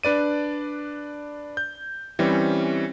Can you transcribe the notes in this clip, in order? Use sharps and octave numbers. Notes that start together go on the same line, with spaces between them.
D4 B4 D5 D#7
G6
E3 G3 C4 C#4